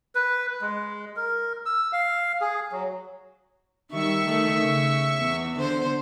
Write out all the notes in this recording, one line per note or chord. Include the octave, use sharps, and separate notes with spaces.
B4
G#3
A#4
E6
F5
G#4
F#3
D#3 G3 E5 C#6
D#3 A3
C#3
E2
D3 C5